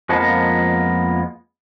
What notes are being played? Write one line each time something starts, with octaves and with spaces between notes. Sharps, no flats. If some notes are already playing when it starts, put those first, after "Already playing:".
F2 F3 G#3 A#3 B3 A5